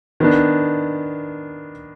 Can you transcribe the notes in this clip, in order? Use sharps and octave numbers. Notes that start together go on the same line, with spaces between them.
D#3 B3 D4